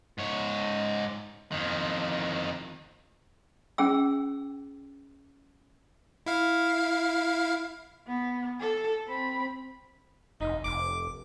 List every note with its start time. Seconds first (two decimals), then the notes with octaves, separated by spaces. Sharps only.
0.18 G#2 C#5
1.52 F2 D#3
3.78 C#4 G#4 G5 E6
6.26 E4 F5
8.07 B3
8.60 A4
9.07 C4 B5
10.41 F1 D#4
10.64 F1 D6